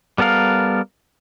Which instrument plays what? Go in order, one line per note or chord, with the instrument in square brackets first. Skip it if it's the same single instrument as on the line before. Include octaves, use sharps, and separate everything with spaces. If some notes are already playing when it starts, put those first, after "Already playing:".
[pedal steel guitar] G3 B3 A4 A#4 F5